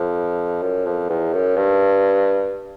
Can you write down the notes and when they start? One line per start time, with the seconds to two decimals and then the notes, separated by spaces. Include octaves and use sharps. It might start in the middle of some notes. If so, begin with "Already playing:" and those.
Already playing: F2
0.62 F#2
0.86 F2
1.10 E2
1.34 F#2
1.57 G2